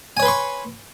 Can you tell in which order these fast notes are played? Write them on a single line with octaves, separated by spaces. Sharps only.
G#5 C#5 B4 C6 C#6